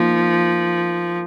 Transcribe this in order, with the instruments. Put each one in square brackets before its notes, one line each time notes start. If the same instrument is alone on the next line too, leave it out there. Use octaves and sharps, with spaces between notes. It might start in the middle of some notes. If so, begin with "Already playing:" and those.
Already playing: [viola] F3 [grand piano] A#3 D#4